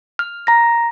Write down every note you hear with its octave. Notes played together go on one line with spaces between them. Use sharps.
F6
A#5 A#6